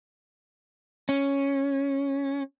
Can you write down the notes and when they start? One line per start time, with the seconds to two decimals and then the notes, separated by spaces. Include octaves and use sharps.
1.09 C#4